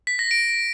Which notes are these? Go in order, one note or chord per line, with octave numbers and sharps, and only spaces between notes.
B6
A#6
D7